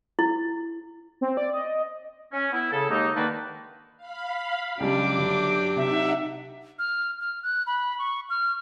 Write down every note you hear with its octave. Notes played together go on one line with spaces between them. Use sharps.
E4
C4
D5
D#5
C#4
B3 E4
C#3 A4
D#2 G#3 A#3 D#4
D3 D#3 A#3 D#4 B4 A5
F5 B5
C#2 F#3 G3 D4 G4 D6
G1
C3 D#4 E5 F#5
F6
F6
F#6
B5
C#6
F6